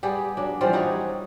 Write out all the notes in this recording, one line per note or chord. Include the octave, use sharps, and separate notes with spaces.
G3 B3 G4 G#4
F#3 D4
E3 F3 G3 C4
G3 D#4 F#4 C#5